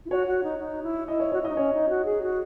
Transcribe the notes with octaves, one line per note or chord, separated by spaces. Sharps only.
E4
F#4 C#5
F#4
D#4
D#4
E4
E4 D#5
C#5
F#4 C#5
E4
D#5
D#4
C#4 C#5
D#4
F#4
G#4
F#4